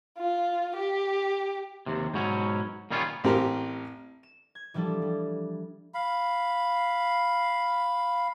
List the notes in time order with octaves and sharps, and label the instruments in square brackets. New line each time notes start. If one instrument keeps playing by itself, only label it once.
[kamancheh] F4
G4
[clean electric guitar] D#2 C3
G#2 B2 F#3 C#4
A#2 D#3 G3 B3 C#4 F4
[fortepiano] A1 C4 G4 A#4 A#5 F6
[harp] E7
G#6
E3 F3 G3 D4 A4
G3
[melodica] F5 B5